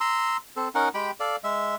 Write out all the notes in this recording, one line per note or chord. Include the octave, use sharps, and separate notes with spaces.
A#5 C6 E6
C4 A4
C#4 D#4 A#4 F#5
G#3 G4 G5 B5
A4 D5 F5
G#3 E5